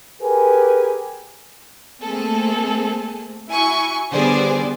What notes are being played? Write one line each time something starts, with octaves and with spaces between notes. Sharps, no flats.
G4 G#4 A#4 B4 G#5
A3 A#3 C4 G#4 A4
E4 F#4 G#5 C#6
D3 G3 B3 G#4 C5 D5